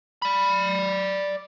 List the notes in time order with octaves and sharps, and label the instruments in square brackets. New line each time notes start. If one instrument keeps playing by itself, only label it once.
[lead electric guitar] D5 B5